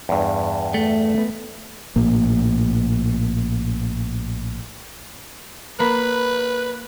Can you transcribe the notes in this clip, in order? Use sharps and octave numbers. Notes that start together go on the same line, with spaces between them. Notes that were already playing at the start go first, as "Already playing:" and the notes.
E2 G2
A3
B3
A#1 A2 A#3
A#3 B4 B5